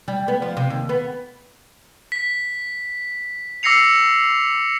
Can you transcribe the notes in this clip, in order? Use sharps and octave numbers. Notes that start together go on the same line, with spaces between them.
G3
B3
F3
C3
D#2
B3
B6
D6 E6 A#6 C7 C#7 F7